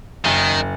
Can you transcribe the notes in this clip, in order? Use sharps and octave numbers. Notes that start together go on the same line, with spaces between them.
F#1 D#3